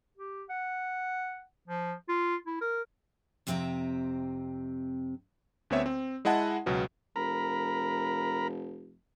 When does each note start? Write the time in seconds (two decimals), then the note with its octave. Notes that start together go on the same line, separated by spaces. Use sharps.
0.17 G4
0.50 F#5
1.68 F3
2.09 F4
2.47 E4
2.61 A#4
3.47 F2 C3 C4 E5 G#5 A#5
5.70 D2 B3 C4 C#5 E5
5.86 C4
6.25 G#3 E4 D#5 F#5 A5
6.66 C#2 B2 F#3 B3
7.16 F1 A#4 A#5 B5